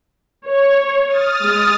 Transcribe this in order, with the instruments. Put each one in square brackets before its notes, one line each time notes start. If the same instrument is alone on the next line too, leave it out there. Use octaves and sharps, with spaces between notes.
[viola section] C#5
[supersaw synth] D#6 F6 A6
[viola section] G#3